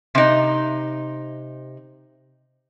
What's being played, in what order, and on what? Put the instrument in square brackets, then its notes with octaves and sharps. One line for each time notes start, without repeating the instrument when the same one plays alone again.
[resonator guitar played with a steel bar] C3 D#4